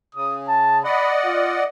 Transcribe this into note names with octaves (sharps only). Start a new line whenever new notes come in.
C#3 D#6
A5
D5 D#5 F#5 B5
F4